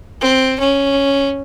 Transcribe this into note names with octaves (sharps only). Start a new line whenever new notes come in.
C4
C#4